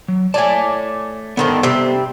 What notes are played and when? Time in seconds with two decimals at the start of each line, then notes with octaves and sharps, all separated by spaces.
0.08 F#3
0.34 A3 C#5 D5 G#5 A5
1.37 D3 D#3 B3 C4 D4 A4
1.63 C3 G3 C4